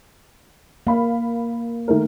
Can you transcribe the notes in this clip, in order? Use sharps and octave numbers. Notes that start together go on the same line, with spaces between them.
A#3 F5 B5
D#3 A3 A#4